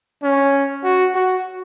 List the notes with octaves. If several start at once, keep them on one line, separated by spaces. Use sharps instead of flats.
C#4
F#4
F#4